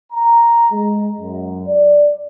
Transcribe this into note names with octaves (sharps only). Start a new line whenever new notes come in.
A#5
G#3
F#2
D5